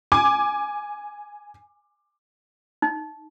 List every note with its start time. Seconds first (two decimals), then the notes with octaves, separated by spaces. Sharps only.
0.12 G#5 D6
2.82 D#4